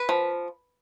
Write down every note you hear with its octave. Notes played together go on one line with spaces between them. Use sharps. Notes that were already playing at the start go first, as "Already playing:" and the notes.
Already playing: B4
F3